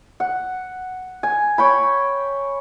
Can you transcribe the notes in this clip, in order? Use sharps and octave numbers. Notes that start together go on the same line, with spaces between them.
F#5
G#5
C#5 G5 B5